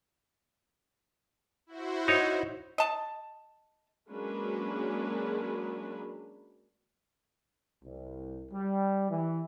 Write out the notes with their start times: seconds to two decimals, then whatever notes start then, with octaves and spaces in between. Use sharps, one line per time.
1.67 E4 F#4 C5
2.08 D#4 C#5
2.78 D#5 A5
4.10 F#3 G#3 A#3 C#4 D4 B4
7.84 C2
8.52 G3
9.11 E3